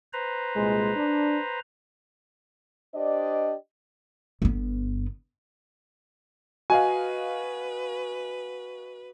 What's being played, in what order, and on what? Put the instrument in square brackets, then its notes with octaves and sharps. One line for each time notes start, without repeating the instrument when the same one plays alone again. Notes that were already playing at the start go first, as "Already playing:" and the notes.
[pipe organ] B4 C5 A#5
[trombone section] C2 A#2 G#3
D4
[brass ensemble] D4 G4 C5 D5 D#5
[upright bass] G1 B3
[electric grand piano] F#4 D#5 F5 [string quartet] B4 [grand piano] G#5